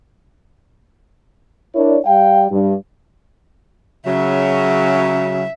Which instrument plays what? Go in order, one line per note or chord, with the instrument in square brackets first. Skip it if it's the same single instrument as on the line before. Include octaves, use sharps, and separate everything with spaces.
[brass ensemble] D4 E4 A#4 C#5 D5
G3 F5 G5
G2
[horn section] C#3 F#3 [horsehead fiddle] E5